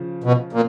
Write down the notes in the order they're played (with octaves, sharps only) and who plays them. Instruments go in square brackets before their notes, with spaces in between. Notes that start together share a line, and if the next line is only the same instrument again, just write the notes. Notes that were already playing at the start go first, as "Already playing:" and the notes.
Already playing: [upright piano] C#3 F3
[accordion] B2
A#2